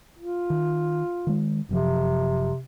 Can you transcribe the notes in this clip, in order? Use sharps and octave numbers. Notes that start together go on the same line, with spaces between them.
F4
D#3
D#3 G#3
F#1 F#2 C3 F3